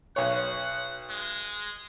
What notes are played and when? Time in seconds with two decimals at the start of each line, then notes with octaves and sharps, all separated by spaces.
0.16 B1 C#5 F#5
1.10 G#3